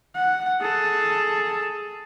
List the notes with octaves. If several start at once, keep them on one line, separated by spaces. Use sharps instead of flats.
F#5
G#4 A4